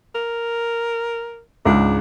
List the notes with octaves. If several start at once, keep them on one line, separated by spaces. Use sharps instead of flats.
A#4
C#2 G#2 D4